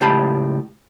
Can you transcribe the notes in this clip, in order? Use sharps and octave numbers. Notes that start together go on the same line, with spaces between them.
C#2 A2 G4 F5 A5 B5